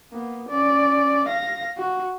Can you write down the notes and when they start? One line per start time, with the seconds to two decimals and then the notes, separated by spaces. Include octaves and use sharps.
0.12 A#3 B3
0.49 C#4 D5
1.28 F5 A#6
1.77 F#4